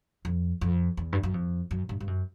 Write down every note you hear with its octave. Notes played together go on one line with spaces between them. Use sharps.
F2
F2
E2
G2
F#2
F2
F#2
G2
G2
F#2